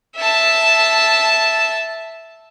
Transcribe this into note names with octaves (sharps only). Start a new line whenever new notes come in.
E5 A5